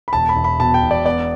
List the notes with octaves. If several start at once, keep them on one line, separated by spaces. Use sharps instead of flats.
B5
E1 A5
B5
E1
B5
B2 A5
G5
E1
D5
B3 D5